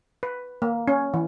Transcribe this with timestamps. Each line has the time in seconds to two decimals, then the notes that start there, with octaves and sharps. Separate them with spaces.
0.23 B4
0.62 A#3
0.88 C#4
1.14 E3